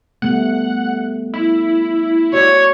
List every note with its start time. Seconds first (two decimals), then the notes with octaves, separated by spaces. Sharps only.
0.22 G3 A3 B3 F#5
1.34 E4
2.33 F#4 C#5 D5